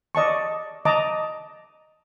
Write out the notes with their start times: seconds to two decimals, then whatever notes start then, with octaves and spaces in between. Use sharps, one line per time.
0.15 D5 D#5 A5 C#6
0.85 D#5 A5 A#5 D6